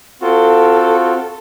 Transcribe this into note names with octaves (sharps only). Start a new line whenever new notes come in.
C4 F4 F#4 A4